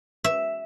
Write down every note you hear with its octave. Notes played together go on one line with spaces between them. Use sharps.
E5